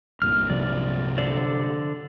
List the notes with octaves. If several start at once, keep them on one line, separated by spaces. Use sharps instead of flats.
C2 G2 A#2 F6
C3 F3 F#3 D5
D3 C5 D5